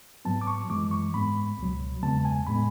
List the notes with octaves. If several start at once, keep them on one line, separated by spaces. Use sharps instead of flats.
G#2 F#3 B3 A5
D6
C#6
F#2 E3 G#3 D6
C#6
G#2 G#3 B3 B5
C#2 B2 F#3
E2 C#3 G#3 B3 A5
G#5
A2 G#3 B3 B5